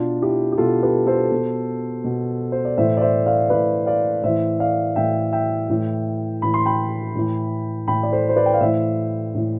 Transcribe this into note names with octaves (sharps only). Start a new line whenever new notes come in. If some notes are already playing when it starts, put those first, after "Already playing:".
Already playing: B2 D4 F4
E4 G4
G4
B2 F4 A4
G4 B4
A4 C5
B2
B2
C5
D5
A2 E3 C5 E5
D5
C5 E5
D5 F5
A2 E3 B4 D5
D5 F5
A2 E3 C5 E5
D5 F5
A2 E3 E5 G5
E5 G5
A2 E3
A2 E3 B5
C6
G5 B5
A2 E3
A2 E3 G5 B5
D5
A4 C5
C5
B4 D5
G5
F5
A2 E3 C5 E5
A2 E3